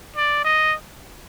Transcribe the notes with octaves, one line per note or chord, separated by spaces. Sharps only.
D5
D#5